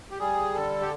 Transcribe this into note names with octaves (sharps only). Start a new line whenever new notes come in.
G4
G3 G#4
D3 A4
G4